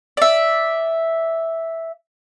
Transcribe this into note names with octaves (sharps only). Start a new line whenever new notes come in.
D5 E5